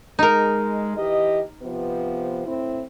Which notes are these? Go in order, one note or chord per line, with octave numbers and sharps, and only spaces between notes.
G#3 D#4 A#4
E3 G4 D#5
C3 F3 B3
A2 C4 E4